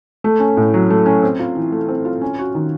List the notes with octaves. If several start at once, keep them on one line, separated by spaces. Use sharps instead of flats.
A3
C#4
A2
F#3
A3
C#4
C4
F4
E3
A3
C4
F4
C#4
F#4
D#3